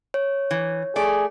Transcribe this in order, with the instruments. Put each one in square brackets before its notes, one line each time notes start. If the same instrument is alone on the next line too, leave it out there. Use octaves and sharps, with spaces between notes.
[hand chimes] C#5
[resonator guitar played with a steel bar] E3
[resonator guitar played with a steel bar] A3 D5 [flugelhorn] G#4